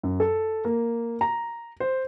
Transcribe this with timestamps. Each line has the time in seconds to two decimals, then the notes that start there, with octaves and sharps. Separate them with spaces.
0.03 F#2
0.20 A4
0.65 A#3
1.21 A#5
1.80 C5